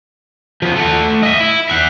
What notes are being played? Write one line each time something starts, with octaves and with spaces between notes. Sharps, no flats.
F3 B3
A3 F#5
D#5 E5
E4
E5 F#5